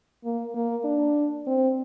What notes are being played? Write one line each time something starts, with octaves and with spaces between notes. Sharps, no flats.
A#3
A#3
D4
C4